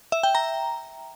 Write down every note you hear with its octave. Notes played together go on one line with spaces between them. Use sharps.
E5
G5
A#5